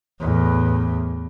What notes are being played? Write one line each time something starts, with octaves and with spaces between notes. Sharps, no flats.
E2 A2